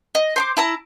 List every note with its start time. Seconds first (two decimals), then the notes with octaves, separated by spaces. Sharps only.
0.15 D#5
0.36 C5 C6 D6
0.57 E4 A5 A#5